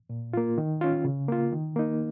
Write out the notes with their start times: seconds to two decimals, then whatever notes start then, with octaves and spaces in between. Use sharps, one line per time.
0.10 A#2
0.33 A#3 F4
0.58 D#3
0.81 C#4 F4
1.05 C#3
1.28 A#3 F4
1.52 D#3
1.76 A#3 D#4